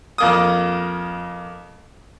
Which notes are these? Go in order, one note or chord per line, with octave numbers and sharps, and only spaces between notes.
F2 A#3 D#6